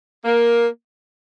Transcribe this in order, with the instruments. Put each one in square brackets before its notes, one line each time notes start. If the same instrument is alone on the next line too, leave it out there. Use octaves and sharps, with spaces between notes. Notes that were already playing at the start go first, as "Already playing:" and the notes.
[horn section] A#3